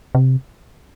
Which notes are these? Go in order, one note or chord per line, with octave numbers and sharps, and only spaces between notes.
C3